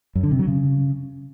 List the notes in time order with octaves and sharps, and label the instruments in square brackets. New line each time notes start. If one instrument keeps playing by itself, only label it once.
[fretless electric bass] F#2
D3
C3
F#3
C#3